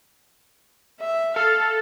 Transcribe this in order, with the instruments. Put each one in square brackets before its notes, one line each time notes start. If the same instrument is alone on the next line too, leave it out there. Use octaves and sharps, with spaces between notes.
[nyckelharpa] E5
[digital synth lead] A4 [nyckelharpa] F5